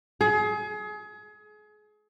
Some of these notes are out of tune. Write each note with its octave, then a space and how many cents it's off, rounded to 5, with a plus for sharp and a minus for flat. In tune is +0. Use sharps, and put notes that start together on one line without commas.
G#4 +30